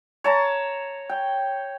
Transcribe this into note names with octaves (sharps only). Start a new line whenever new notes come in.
C#5 A5 A#5
G5